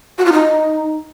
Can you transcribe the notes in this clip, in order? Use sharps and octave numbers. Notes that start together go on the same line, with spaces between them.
F#4
F4
D#4